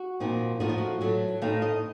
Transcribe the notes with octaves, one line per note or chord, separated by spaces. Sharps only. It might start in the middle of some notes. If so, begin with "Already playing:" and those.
Already playing: F#4
A#2 F3 C4 D#4
A2 F3 A3 D#4 F#4
F4
F#4
A2 F#3 A3
A2 A3 C4 D#4 F5
D#5